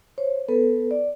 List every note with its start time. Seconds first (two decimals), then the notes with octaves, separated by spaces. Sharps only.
0.18 C5 C#5
0.48 B3 A4 B4
0.91 D5